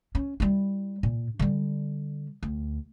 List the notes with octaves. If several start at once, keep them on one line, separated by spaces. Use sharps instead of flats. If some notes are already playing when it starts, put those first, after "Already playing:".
C#4
G3 E4
A#2
D3 G3
D2